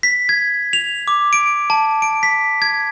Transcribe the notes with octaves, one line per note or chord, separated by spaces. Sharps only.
B6
G#6
F7
D6
D7
A5
D7
B6
G#6